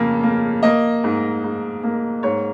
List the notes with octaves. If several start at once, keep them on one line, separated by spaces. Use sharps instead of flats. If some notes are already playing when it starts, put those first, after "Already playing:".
Already playing: F2 C#3 A#3
A#3
A#3 D#5
G#2
G#2
A#3
G#2 C#5